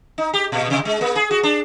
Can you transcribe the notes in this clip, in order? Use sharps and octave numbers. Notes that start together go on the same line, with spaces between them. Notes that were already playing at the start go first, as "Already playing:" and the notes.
D#4
G4
A#2
C3
G#3
A#3
G#4
F#4
D4